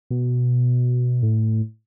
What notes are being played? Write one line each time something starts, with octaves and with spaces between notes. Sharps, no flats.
B2
A2